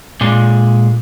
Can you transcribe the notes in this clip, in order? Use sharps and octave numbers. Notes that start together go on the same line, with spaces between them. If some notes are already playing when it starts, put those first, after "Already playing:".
A#2 G#3